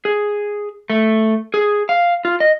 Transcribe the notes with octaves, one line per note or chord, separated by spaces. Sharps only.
G#4
A3
G#4
F5
F4
D#5